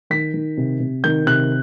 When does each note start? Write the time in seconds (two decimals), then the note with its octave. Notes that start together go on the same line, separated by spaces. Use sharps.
0.10 D#3 B6
0.34 D#3
0.57 C3
0.80 C3
1.04 D#3 G6
1.26 C3 F#6